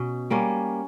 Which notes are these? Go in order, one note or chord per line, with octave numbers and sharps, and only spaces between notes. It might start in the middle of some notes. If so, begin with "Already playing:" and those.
Already playing: B2 C#4
G3 A#3 C#4